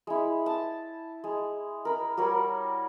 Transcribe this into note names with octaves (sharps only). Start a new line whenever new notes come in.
G#3 E4
A5
G#3
A#4 B5
G3 F#4 A#4 C#5